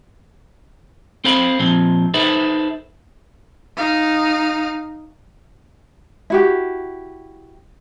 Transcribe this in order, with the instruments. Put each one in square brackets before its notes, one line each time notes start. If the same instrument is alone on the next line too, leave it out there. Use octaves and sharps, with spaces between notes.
[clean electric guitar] C4 A4 C5 F5 B5
A#2 F3 C4
D#4 A4 B4 C5 E5
[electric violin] D#4 F5
[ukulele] E4 F#4 G4